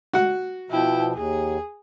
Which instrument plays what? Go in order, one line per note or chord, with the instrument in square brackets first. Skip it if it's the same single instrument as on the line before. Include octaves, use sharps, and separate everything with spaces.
[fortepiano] F#4 F#5
[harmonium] B2 F3 [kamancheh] E4 G5
[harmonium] D#2 [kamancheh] G#4